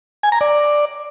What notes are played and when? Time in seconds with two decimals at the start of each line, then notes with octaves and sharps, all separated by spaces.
0.23 G#5
0.32 A#5
0.41 D5